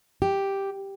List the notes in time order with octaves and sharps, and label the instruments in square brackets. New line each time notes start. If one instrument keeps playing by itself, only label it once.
[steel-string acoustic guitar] G4